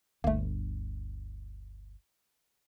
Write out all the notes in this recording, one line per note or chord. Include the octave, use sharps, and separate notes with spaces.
G1 D2 A3 A#3